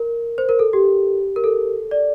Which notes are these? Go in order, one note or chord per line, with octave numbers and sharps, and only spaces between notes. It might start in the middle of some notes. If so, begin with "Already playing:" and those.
Already playing: A#4
C5
A#4
A4
G4
A#4
A4
D5